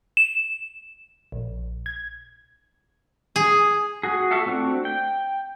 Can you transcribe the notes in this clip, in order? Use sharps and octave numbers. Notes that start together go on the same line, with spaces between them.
E7
A#1
G#6
G#4
F#4 G#4
F4 F#4 A4 E5 F5
A3 C4 D4 F#4
G5